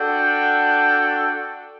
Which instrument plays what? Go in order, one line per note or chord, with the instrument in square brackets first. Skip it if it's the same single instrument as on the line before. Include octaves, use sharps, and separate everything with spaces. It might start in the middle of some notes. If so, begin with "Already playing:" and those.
Already playing: [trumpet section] D4 F#4 A4 D5 G5